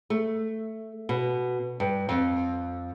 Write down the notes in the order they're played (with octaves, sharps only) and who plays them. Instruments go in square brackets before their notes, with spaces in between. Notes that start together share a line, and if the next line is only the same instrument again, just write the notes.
[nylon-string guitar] A3
B2
G2
F2